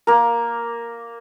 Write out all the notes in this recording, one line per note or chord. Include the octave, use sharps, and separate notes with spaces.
A#3 A#4